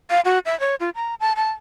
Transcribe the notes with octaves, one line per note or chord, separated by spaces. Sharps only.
F5
F#4
E5
C#5
F4
A#5
A5
A5